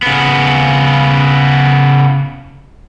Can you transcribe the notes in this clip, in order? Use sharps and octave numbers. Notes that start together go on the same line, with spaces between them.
C#3 B3